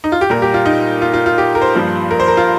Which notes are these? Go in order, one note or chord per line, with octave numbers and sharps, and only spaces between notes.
D#4
F4
G4
A#2 G3 A#3 A#4
G4
F4
D#4
F4
F4
F4
G4
A#4
C5
G2 F3 A#3
A#4
C5
A#4
F4